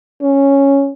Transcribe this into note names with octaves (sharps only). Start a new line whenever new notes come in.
C#4